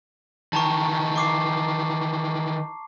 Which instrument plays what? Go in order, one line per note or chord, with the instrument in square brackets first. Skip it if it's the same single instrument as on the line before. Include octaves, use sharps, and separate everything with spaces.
[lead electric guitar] D#3 E3 [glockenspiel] A5 A#5 C#6
[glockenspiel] C#6 D6 C7